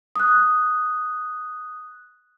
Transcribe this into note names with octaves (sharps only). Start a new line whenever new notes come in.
D#6 F#6